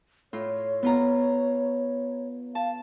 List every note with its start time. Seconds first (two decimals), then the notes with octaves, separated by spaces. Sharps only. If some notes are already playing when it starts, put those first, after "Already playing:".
0.33 A2 F4 C#5
0.83 B3 F4 A#5
2.55 F5 A5